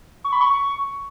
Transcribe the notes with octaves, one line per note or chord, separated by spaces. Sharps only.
C#6
B5
C#6